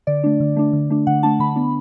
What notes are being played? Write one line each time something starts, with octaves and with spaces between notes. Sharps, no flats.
D3 D5
A3 D4
D3
A3 D4
D3
A3 D4
D3 F#5
A3 D4 A5
D3 B5
B3 D4